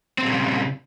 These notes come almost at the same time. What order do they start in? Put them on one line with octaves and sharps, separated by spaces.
C4 A#2 G3 C#3